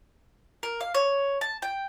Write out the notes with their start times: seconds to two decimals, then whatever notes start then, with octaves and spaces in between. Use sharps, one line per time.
0.63 A#4
0.81 F5
0.94 C#5
1.41 A5
1.62 G5